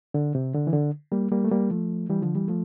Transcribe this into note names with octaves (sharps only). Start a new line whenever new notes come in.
D3
C3
D3
E3
D3
G3 A#3
G3 A#3
A3
G3 A#3
F3 A3
E3 G3
D3 F3
E3 G3
F3 A3